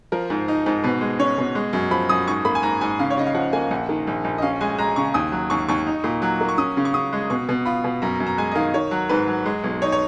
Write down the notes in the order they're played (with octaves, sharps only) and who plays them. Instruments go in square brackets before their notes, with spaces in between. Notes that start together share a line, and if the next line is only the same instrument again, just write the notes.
[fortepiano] F3 [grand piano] A#4
[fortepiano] G#2
D#4
G#2
[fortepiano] B2 [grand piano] B4
[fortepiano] G#3
[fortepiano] C#4 [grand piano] C#5
[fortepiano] B2
G#3
F#2
[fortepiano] F3 [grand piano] B5
[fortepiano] F#2 [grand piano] D#6
[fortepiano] G#2 [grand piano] C#6
[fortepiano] A#3 [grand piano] B5
[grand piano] G#5
[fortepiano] G#2 [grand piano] A#5
[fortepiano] G#2 [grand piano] G#5
[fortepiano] C#3 [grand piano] F5
[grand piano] C#5
[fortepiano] C#3 [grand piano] D#5
[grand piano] F5
[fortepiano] F3 [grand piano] F#5
[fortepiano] A#3 [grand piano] G#5
[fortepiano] A#1 [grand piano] F#5
[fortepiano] D#3
A#1
A#1
[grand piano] D#5
[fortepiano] C#4 [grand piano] F5
[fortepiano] G#3 [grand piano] G#5
[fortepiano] G#3 [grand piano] A#5
[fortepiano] C#3 [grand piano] C#6
[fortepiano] D#2 [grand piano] D#6
[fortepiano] F#3
[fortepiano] D#2 [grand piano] C#6
[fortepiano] D#2 [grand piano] C#6
[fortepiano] D#4
A#2
F#3
A#3
[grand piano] C#6
[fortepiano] C#4 [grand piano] D#6
[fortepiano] C#3
[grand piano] C#6
[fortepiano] C#3 [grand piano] D#6
[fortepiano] G#3
[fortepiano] B2 [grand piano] C#6
[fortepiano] B2
[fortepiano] F4 [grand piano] B5
[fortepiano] B2
[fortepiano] F#2 [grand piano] A#5
[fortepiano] F#2
[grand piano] A#5
[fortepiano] G#3 [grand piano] G#5
[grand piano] D#5
[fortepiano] D#3 [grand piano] F5
[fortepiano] D#3 [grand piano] C#5
[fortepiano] F#3
[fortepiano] G#2 [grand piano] B4
[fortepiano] F#3
G#3
B1
[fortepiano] D#4 [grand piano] C#5
[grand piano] C#5